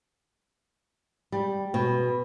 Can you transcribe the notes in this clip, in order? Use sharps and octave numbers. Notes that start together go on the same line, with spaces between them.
G3
B2